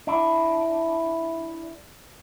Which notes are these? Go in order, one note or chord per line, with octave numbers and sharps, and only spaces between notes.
D4 E4